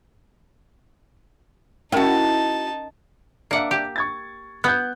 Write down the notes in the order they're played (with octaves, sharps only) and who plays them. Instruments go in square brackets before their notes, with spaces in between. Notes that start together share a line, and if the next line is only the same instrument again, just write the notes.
[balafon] C#4 A#4 G5 [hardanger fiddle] D#4 A5 [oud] E4 F#4
[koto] A#3 F#5 [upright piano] D4 E5
[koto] G4
[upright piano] C#6 G#6 A6
[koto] B3 [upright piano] F#6 G6